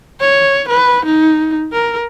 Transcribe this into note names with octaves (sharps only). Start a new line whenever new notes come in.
C#5
B4
D#4
A#4